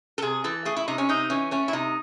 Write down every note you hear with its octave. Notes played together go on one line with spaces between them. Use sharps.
A4
C3 G#4
E3 A4
A3 G#4
E4
C3 D#4
C#4
C3 D#4
E3 C#4
A3 C#4
E4
C3 D#4